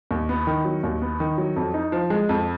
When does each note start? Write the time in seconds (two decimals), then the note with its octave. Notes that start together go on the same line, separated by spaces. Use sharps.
0.11 D#2
0.29 B3
0.47 D#3
0.65 F#3
0.83 D#2
1.02 B3
1.20 D#3
1.38 F#3
1.56 F2
1.74 D#4
1.92 F3
2.10 G#3
2.29 F2